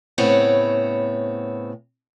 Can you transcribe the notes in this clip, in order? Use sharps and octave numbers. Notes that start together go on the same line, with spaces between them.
A2 C#3 B3 C4 C#5 F#5